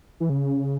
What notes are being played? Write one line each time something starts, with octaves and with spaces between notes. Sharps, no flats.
E3
C#3